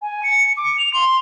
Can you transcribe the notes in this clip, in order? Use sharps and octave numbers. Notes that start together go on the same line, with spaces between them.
G#5
C#7
D6
F7
C6